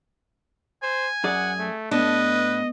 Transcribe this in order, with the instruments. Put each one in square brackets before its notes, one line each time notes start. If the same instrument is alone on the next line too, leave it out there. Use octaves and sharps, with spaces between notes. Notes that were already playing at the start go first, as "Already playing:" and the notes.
[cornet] C5 [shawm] G#5
[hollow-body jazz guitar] F#2 G#4 D5 [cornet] F#5
[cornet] A3
[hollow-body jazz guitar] A2 D4 [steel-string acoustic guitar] B3 [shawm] B4 [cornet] D#5